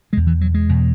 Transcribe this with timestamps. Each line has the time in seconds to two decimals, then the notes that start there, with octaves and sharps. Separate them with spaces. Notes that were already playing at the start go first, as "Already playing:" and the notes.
0.13 B2 G#3
0.17 E2
0.27 E3
0.41 F#3
0.54 G#3
0.69 E2 B2